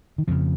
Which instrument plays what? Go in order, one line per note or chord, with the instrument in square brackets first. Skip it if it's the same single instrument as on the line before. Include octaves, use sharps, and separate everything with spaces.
[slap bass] D#3
F2 C#3 F3